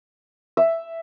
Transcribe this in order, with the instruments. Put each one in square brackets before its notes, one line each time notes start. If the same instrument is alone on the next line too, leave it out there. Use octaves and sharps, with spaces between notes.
[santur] E5